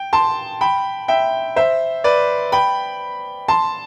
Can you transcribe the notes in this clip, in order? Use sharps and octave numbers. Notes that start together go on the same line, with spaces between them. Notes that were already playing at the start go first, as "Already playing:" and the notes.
Already playing: G5
A5 C6
G5 B5
E5 G5
C5 E5
B4 D5
G5 B5
A5 C6